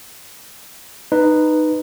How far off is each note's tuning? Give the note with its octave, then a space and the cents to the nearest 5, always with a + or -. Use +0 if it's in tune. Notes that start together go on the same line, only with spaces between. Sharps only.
D#4 -15 B4 +0